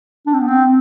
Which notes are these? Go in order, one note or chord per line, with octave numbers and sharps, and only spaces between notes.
D4
C4
B3
C4